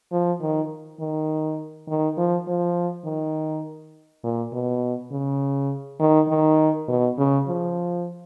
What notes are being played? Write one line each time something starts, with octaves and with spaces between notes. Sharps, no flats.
F3
D#3
D#3
D#3
F3
F3
D#3
A#2
B2
C#3
D#3
D#3
B2
C#3
F3